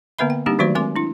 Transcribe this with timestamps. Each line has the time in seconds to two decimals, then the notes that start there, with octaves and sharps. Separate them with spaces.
0.19 D3 A#3 B3 B4 E5 B5
0.30 G5
0.46 G3 A#3 C4 D4 D#4 G4
0.59 D#3 F#3 A3 F#4 C5 D5
0.75 G#3 C4 A#4 G#5 C6 D6
0.96 D4 E4